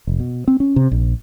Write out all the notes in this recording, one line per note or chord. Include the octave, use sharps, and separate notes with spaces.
F1
B2
C4
C#4
C3
A#1